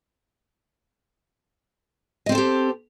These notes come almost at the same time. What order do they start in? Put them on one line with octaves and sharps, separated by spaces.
D#5 C4 A4 C5 G4